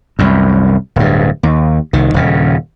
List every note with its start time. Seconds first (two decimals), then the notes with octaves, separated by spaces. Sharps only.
0.19 C2 F#2
0.96 D1 G2
1.43 D#2
1.93 C2 D#3
2.14 D#1 C#3